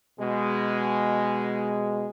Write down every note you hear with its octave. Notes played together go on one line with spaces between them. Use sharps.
B2 G#3